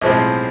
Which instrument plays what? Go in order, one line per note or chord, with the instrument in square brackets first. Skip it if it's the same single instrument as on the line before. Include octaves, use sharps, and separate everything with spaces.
[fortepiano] B1 A2 F3 G#3 C4